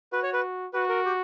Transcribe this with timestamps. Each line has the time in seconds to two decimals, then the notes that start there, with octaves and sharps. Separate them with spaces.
0.13 F#4 B4
0.23 C#5
0.33 B4
0.74 F#4 B4
0.89 A#4
1.05 G4